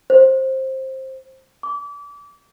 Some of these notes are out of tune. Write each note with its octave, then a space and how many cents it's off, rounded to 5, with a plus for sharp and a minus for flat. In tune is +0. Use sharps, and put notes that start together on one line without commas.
C5 +15
D6 -30